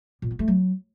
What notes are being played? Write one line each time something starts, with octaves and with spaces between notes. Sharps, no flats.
A#2
B3
A3
F#3